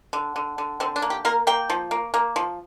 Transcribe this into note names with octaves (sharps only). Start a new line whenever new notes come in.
D3
D3
D3
D3 C4
D4
A#3
G4
A#3 A#4
A#3 G5
F3
A#3
A#3
F3